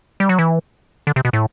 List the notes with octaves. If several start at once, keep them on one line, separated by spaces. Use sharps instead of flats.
G3
F#3
E3
D3
C3
B2
A2